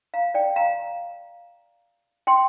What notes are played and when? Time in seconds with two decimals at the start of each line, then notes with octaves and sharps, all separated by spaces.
0.14 F5 A#5
0.34 D5 G5
0.56 F5 A#5
2.27 G5 C6